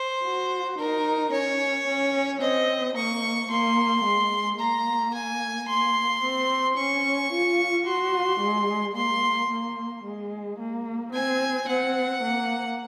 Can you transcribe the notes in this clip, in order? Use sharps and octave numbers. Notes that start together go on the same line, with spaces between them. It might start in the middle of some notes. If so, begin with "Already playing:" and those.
Already playing: C5
F#4
D#4 A#4
C#4 C#5
C#4
C4 D#5
A#3 C#6
A#3 C6
G#3
A#3 A#5
G#5
A#3 C6
C4
C#4 C#6
F4
F#4 C6
G#3
A#3 C6
A#3
G#3
A#3
C4 G#5
C4 F#5
A#3